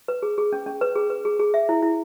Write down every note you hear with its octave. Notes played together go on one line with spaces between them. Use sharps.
B4
G#4
G#4
C#4
C#4
B4
G#4
B4
G#4
G#4
E5
E4
E4